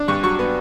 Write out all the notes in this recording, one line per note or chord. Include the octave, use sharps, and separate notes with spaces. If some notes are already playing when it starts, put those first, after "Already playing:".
Already playing: D4
G2 C#6
F#3 C#6
B3